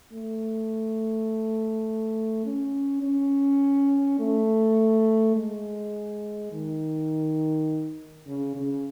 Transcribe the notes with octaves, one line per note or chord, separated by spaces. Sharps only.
A3
C#4
C#4
A3
G#3
D#3
C#3
C#3